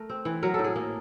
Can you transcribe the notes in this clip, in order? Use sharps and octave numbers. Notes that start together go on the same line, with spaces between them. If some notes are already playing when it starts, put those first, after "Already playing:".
Already playing: A3 A#4
C4
E3
F#3 A#4
A2 A4
G#4
A#3